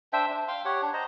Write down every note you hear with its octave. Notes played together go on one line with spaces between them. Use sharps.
D4 C5 E5 G5
D4
F5 G5 C6
G4 C#5 F#5
D4
C5 D#5 A#5